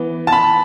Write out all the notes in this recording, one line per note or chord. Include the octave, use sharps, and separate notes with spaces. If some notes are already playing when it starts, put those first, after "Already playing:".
Already playing: E3 B3
A5
B5